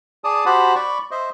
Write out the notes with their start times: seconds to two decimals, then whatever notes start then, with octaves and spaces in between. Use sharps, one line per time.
0.24 G#4 D5 A5 D#6
0.46 F#4 G4 C5 F#5 A5 B5
0.75 D5 B5 C#6
1.11 C5 D#5 E5